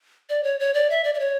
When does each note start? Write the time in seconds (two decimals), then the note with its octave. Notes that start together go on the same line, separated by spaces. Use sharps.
0.29 D5
0.43 C#5
0.60 C#5
0.74 D5
0.90 E5
1.04 D5
1.14 D5
1.20 C#5